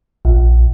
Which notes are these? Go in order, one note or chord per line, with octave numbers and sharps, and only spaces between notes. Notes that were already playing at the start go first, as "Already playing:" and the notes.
A#1